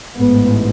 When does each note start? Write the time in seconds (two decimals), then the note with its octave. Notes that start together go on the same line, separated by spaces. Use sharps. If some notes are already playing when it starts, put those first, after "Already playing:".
0.16 A1 G#2 B3